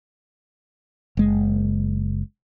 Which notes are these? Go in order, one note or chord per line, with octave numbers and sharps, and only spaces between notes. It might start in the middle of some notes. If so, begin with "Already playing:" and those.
F#1 G#3